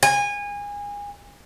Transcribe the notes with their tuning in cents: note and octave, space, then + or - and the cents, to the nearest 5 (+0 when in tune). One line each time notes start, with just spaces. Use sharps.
G#5 -25